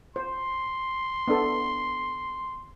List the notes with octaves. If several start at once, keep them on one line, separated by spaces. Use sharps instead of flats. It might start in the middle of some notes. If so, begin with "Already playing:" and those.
C5 C6
B3 D4 A4